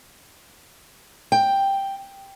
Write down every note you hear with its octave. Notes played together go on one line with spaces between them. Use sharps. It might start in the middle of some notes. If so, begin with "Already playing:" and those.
G5